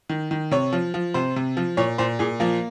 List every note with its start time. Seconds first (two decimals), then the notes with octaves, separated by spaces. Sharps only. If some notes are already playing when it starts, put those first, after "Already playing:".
0.09 D#3
0.31 D#3
0.51 C3 C#5
0.73 F3
0.94 F3
1.14 C3 C5
1.36 C3
1.57 F3
1.77 A#2 C#5
1.98 A#2 C5
2.19 A#2 G#4
2.40 F3 A#3